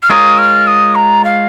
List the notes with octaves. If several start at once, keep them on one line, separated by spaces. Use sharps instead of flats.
F6
G#3 F4 A#4 C#5 D#6
F6
D#6
A#5
F5